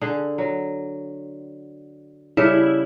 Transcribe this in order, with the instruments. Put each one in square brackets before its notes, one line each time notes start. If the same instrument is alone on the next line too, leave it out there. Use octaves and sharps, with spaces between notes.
[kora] D3 G#4
F#3
[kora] C#3 G3 A4 [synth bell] E4